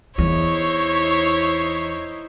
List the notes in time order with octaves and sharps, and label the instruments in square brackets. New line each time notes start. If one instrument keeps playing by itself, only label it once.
[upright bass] E2 [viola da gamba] D#4 E4 C5 [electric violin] C#5